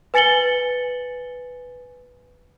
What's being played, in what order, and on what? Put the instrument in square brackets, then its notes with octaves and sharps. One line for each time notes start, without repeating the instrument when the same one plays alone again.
[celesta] B4 G#5 A6 C#7 F#7 G7